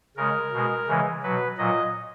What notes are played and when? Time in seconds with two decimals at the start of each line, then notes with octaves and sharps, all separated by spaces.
0.17 C#3 G#3 A#4
0.53 B2 G#3
0.88 C#3 E3 G#3
1.23 B2 F#3 B4
1.58 A#2 F#3 D#5